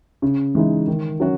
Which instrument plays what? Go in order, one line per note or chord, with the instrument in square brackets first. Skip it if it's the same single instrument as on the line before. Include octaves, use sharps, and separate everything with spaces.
[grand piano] C#3
E3 G#3 D#4
D#3
F#3 C#4 F#4